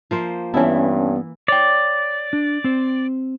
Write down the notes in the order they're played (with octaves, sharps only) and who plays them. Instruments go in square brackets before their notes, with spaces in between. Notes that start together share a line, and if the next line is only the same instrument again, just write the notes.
[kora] F3 A#3 C5
[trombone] G2 [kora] E3 E4 [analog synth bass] B3 [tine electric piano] C#4 A5
[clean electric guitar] C#5 G5 [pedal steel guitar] D5
[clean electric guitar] D4
C4 C5